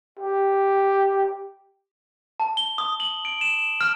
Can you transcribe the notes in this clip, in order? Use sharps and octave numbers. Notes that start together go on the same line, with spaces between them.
G4
A5
G7
D#6
F#7
D7
E7
F6